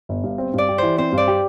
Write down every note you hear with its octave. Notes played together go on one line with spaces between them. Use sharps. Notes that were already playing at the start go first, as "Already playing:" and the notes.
G1
G2
C4
G2 D5
G4
E3 C5
C4 C5
G2
D5
G4